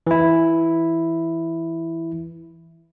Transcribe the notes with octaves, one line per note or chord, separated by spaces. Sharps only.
E3 E4